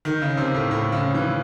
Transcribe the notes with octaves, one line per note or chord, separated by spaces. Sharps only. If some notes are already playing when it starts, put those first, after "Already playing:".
D#3
C#3
C3
A2
A2
C#3
E3